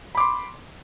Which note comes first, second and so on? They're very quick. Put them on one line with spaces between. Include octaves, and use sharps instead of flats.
B5 D6 C6